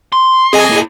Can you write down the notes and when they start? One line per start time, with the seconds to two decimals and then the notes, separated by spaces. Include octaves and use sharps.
0.12 C6
0.53 C4 G#4 A4 D#5 G#5
0.70 A#3 E4